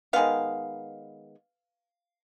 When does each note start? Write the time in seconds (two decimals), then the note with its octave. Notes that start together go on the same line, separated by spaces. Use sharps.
0.13 D#3 G#3 B3 F5